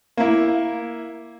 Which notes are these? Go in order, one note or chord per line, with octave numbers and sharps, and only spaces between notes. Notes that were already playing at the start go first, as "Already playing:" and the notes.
A#3 E4